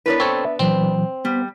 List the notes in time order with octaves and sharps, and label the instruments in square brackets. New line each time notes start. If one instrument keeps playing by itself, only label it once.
[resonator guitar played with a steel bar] B3 D4 B4 [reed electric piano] E4 A#4 C#5
[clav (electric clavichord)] C4 A4 C#5 [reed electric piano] C#6
[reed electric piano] E5
[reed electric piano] A#2 E3 F#3 [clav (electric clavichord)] C4
[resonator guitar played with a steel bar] G3 [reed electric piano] B3